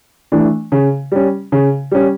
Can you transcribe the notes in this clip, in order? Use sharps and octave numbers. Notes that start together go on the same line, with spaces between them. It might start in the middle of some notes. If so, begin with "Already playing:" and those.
E3 A3 D4
C#3
G3 C#4
C#3
G3 C#4